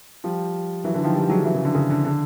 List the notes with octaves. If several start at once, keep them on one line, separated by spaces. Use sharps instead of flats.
F3 G3
E3 F#3
D3 E3
D#3 F3
F3 G3
F#3 G#3
E3 F#3
C#3
D3
C#3
D3
D3